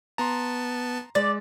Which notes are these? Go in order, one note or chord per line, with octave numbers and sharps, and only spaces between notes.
B3 A5 A#5 C6
G#3 D5 A6